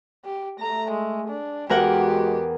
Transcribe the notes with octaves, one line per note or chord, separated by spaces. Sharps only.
G4
A3 A#5
G#3
D4
E2 G#3 F#4 G4 A#4 F#5